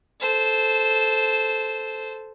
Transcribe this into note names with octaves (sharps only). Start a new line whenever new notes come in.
A4 C5